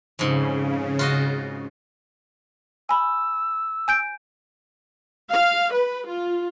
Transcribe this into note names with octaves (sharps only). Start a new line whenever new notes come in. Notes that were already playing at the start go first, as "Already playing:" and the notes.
F2 G#2 C#3
F4 F#4 D#5
G#5 B5 E6
G#5 G6 D7
F5
B4
F4